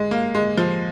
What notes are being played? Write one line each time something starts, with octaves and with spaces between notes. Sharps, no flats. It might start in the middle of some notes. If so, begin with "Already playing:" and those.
Already playing: G#3
A#3
G#3
F3